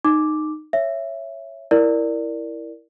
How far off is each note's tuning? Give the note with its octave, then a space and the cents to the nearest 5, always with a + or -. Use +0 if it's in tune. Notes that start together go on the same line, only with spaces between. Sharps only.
D#4 -15 D6 +0
C#5 -5 E5 +15
E4 +0 A#4 +0 D5 +0